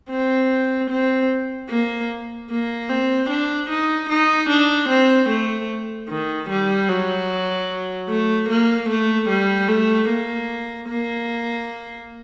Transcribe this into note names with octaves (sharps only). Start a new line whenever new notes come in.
C4
C4
A#3
A#3
C4
D4
D#4
D#4
D4
C4
A3
D#3
G3
F#3
A3
A#3
A3
G3
A3
A#3
A#3